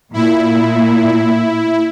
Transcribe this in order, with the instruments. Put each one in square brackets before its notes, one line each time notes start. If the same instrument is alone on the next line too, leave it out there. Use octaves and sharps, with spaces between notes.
[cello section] A#2 [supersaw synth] E4